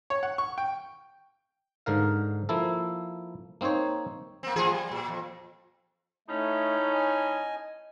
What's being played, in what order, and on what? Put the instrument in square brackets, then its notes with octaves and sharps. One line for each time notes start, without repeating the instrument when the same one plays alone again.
[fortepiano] C#5
F#5
C#6
G5
[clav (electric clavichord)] G#2 D3 A#4 F5
F3 A#3 E4 A4
A#3 C4 D#4 C5 C#5
[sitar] A#3 C4
A2 F3 G#4
G3
A#2
F2
[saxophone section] A2 C#4 D#4 [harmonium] A3
[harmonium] D#5 G#5